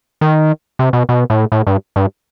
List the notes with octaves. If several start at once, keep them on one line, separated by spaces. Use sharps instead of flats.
D#3
C3
B2
B2
A2
A2
G2
G2